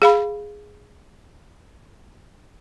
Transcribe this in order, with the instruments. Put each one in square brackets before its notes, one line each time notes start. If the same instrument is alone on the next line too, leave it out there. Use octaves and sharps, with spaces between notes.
[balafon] G#4 F5 B5